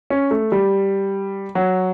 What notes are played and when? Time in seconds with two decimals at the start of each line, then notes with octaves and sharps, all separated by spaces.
0.10 C#4
0.31 A3
0.52 G3
1.55 F#3